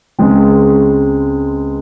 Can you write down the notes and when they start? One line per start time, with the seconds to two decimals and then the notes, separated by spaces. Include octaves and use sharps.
0.19 C#2 C#3 G#3 C4